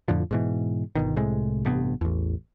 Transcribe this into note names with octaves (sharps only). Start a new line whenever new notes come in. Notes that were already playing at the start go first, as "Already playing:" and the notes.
F2 A2 D3 F3
G#2 B2 E3
G1 B2 D#3
C2 A2 C3 G#3
A1 G2 C3 B3
A1 E2